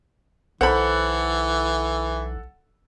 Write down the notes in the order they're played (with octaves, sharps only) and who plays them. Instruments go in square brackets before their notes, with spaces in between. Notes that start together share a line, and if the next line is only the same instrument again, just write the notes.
[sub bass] B1 [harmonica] E3 [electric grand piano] A4 F#5 [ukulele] C5 B5